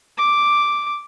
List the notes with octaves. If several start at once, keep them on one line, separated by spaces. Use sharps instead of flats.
D6